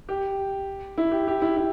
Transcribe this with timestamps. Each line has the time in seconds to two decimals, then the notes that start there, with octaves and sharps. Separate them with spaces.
0.09 G4
0.98 E4
1.12 G4
1.28 G4
1.42 E4
1.57 E4